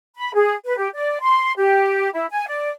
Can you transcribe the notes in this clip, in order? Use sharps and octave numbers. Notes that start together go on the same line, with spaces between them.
B5
G#4
B4
G4
D5
C6
G4
E4
G#5
D5